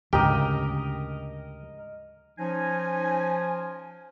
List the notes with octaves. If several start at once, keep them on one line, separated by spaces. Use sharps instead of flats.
D2 G#2 C#3 G4 A#4 D#5 G5
F3 C#4 D#4 G#5